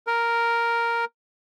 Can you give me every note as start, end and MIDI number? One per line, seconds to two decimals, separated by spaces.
0.07 1.05 70